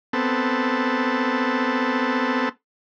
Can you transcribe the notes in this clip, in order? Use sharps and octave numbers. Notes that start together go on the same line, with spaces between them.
B3 C4 A4